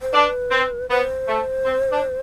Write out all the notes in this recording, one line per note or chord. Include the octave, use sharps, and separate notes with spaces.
C5
D4 B4
C4
B3 C5
A3
C4
D4